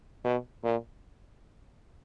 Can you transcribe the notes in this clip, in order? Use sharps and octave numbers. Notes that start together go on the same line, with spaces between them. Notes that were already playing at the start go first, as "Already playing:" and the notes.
B2
A#2